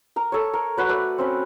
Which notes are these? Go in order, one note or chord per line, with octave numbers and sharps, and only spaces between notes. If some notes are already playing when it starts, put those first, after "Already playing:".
A#4 A#5
A4 C#5
A#4
F#4 B4 C#5
A3 B4 D5
C4 C#4 B5